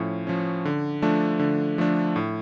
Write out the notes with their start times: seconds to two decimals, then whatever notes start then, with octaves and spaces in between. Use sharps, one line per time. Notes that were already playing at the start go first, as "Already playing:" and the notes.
Already playing: A2 F3 C#4
0.27 F3 C#4
0.65 D3
1.02 F3 A3 D4
1.39 D3
1.78 F3 A3 D4
2.16 A2